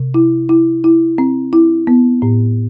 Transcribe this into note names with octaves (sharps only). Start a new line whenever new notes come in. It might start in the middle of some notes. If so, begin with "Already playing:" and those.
Already playing: C3
E4
E4
E4
C4
E4
B3
A2